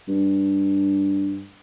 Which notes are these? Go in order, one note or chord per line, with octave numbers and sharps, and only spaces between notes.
G2